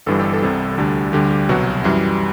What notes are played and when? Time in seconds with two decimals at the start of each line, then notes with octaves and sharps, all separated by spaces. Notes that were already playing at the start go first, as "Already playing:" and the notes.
0.06 G1 G2 E3 G3 A4
0.20 G4
0.33 A4
0.42 C2 C3 G3
0.78 D2 D3 G3
1.13 D2 D3 G3 G4
1.31 G4
1.49 C2 B2 F#3 F#4
1.84 F#2 E3 G3 E4